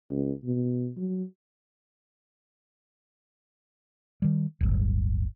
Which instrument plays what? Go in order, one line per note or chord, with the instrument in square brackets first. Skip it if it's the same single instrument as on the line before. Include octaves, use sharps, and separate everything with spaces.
[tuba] C#2
B2
F#3
[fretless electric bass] D#3 G3
D1 G1